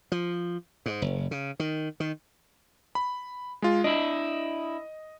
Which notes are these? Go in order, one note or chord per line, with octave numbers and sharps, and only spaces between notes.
F3
G#2
F#1
C#3
D#3
D#3
B5
G#3 F4
D4 E4 D#5